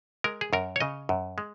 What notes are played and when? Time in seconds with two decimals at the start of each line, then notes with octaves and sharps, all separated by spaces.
0.24 G#3 A#4
0.41 G#4
0.53 F#2 A#4
0.76 C#5
0.80 C#3 D#5
1.09 F#2
1.38 G#3